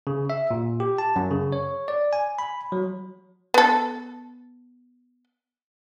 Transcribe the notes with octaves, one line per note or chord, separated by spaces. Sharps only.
C#3
E5
A#2
G4
A5
F#2
C#3
C#5
D5
G#5
B5
F#3
B3 A4